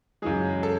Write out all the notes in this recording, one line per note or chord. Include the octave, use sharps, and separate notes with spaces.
F#2 C#3 E3 G#3 G#4
A4